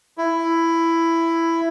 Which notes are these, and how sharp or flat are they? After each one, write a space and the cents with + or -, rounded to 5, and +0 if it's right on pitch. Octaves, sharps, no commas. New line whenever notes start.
E4 +10